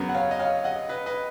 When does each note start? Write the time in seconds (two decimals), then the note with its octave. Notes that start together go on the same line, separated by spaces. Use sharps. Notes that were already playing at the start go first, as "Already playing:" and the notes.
Already playing: F#2 C#3 F#3 B3
0.09 F#5
0.15 C#5 F5
0.31 D#5
0.39 C#5 F5
0.64 D#5 F#5
0.89 B4 D#5
1.06 B4 D#5